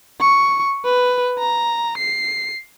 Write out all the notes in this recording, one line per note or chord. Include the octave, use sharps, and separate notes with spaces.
C#6
B4
A#5
C7